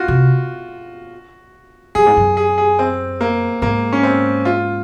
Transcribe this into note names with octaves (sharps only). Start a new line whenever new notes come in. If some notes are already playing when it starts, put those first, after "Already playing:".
Already playing: F4 F#4
C3
F#2 G#4
G#2
F#2
G#4
G#4
C4
A#3
G#2 A#3
C#4
C4
F4